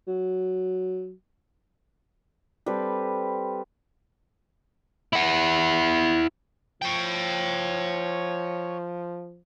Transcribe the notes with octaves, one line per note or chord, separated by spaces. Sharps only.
F#3
G3 C4 A4 B4
E4 F#5
F3 C#5 G5